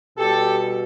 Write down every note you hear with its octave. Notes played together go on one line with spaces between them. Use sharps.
B2 G3 G4 A4